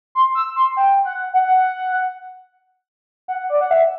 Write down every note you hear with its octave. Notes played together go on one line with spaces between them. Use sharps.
C6
E6
C6
G5
F#5
F#5
F#5
D5
F#5
E5